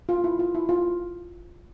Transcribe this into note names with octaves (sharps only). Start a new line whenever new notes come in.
F4
E4
F4
E4
F4